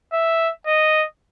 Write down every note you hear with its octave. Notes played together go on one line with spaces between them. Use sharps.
E5
D#5